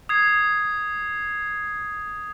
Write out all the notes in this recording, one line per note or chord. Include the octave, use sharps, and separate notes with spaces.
D#6 G#6 C7